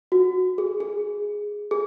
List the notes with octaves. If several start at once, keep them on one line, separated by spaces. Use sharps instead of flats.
F#4
G#4
G#4
G#4